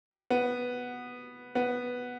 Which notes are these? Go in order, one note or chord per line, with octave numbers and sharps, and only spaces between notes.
B3
B3